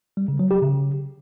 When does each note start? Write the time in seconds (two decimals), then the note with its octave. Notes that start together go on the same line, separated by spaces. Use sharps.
0.17 G3
0.28 C#3
0.39 F#3
0.51 G4
0.62 C#3